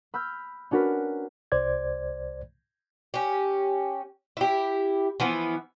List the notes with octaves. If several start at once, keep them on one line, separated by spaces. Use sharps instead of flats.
B5 E6 F6 G6
C#4 D4 F#4 A#4 B4
C2 C5 D5 G#6
C#4 G4
E4 G4
E3 F3 B3